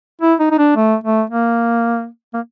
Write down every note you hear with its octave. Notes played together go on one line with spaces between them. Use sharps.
E4
D#4
D#4
D4
A3
A3
A#3
A#3